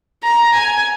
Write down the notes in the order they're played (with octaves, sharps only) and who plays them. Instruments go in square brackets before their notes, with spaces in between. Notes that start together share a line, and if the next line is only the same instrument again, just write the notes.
[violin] A#5
G#5